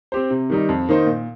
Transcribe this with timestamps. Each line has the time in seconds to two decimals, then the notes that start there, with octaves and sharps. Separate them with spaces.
0.12 C4 G4 C5
0.30 C3
0.50 D#3 G3 D#4
0.69 F2
0.89 D#3 A#3 D#4 C5
1.06 A#2